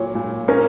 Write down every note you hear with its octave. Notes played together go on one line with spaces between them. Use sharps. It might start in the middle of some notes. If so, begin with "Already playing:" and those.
Already playing: A#2 F#3 C#5
A#2
C#4 A#4